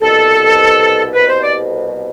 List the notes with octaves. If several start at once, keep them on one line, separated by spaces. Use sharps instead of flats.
C2 B2 A4
C2 B2 B4
C5
D5